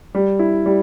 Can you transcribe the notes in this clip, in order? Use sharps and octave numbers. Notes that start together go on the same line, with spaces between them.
G3
E4
G3